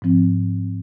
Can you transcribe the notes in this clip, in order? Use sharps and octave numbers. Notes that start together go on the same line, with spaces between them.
G#2 F3 C4